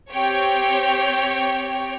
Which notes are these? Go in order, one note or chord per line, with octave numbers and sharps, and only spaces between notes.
C4 G4 C#5 G5